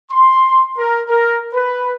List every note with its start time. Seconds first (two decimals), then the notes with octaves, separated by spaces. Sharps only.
0.10 C6
0.77 A#4
1.09 A#4
1.54 B4